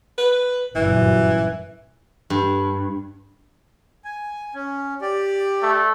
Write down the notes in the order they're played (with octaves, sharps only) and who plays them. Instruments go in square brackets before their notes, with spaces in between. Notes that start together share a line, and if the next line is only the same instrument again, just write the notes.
[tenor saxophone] B4
[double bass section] G1 F#2 A#2 [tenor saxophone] E3
[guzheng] G2
[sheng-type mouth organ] G#5
C#4
G4 D5
[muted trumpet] A3